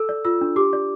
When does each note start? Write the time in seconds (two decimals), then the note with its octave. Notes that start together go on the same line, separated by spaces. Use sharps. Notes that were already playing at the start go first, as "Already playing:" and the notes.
Already playing: A4 E6
0.09 D5
0.25 F4 E6
0.41 D4
0.56 G4 D6
0.73 D5